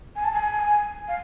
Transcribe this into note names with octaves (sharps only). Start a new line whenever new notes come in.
G#5
A5
G#5
F5